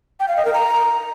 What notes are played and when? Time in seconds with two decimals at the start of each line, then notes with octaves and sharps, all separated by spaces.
0.20 G5
0.28 F5
0.37 D#5
0.45 A#4
0.53 A#5